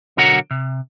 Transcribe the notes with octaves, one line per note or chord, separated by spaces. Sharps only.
B1 D3 F#4 A#4 C#5 F#5
C3